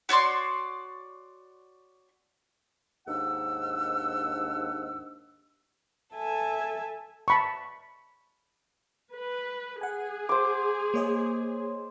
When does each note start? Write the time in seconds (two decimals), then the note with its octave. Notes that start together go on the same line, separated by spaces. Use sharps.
0.09 F#4 C#5 D5 C6
3.08 D#2 G#2 D4 F#5 E6
6.13 A4 E5 G#5 A5
7.28 A5 B5 C#6
9.13 B4
9.81 G#4 F#5 G#5
10.29 C5 D6
10.94 A#3 C#5 D#5